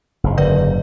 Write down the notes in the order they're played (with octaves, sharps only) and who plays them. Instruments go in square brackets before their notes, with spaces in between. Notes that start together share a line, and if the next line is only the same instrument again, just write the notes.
[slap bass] F#1 G#2
[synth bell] D3 B4 D5